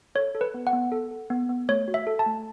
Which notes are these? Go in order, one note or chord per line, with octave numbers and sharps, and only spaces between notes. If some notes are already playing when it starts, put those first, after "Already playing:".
A4 C#5
A4
B4
B3
F#5
B3
A4
A4
B3
B3
A3 C#5
F#4
E5
A4
A5
A3